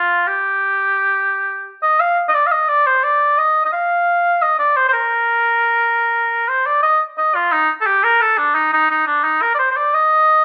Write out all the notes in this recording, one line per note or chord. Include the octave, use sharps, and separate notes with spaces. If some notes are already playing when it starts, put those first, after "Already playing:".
Already playing: F4
G4
D#5
F5
D#5
D5
F5
D#5
D5
C5
D5
D#5
D#5
F5
D#5
D5
C5
C5
A#4
C5
D5
D#5
D#5
F4
D#4
A4
G4
A#4
A4
D4
D#4
D#4
D#4
D4
D#4
A#4
D5
C5
C5
D5
D#5